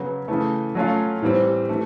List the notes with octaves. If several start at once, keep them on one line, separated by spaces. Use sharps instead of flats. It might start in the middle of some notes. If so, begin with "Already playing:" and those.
Already playing: C#3 F#3 B3
C#3 E3 A3
F#3 A3 C#4 F4
A2 E3 G3 C4
E3 A3